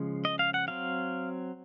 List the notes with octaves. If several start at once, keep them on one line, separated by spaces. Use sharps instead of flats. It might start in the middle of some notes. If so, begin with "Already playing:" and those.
Already playing: C#3 F3 G#3 C#4
D#5
F5
F#5
F#3 C4 F5